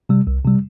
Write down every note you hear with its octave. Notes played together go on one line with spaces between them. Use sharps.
C3 G3
C2
C3 G3